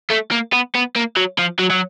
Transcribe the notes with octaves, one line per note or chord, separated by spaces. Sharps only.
A3
A#3
B3
B3
A#3
F#3
F3
F#3
F#3